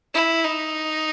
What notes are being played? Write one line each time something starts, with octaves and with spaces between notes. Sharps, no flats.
E4
D#4